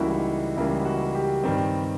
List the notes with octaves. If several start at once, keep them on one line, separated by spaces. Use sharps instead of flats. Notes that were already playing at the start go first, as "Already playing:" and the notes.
Already playing: C#2 C#3 E3 G3 A#3 E4 F#4
D#4
C#2 C#3 E3 G3 A#3 E4
F#4
G4
G2 D#3 G3 C4